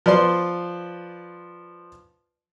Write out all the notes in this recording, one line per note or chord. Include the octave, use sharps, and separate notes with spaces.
F3 B4 D5 C6